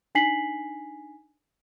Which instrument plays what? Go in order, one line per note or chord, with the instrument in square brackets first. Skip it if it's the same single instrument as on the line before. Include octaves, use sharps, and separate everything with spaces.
[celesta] D4 D#4 G#5 B6 C7 F#7